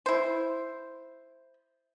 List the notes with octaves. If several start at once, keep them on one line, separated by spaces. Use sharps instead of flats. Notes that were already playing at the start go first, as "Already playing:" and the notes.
E4 C5